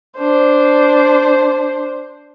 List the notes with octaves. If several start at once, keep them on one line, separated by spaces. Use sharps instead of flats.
D4 C5